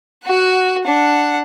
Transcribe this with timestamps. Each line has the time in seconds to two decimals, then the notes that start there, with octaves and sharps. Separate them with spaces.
0.24 F#4 F#5
0.84 D4 F#5